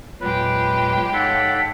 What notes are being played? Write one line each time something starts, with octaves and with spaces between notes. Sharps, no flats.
E2 A#2 F#3 G#3 G4 B4 G5
G#2 A4 C#5 F5 F#5 B6